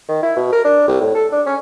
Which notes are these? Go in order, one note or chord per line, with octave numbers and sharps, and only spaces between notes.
D#3
E4
B2
A#4
D4
C2
A2
A4
D4
C#4